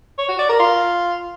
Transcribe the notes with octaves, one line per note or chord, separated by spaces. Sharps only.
C#5
F#4
D5
A#4
F4